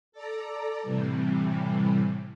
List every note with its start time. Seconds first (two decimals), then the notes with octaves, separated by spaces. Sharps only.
0.12 A4 D5 A#5
0.82 A2 C3 E3 G3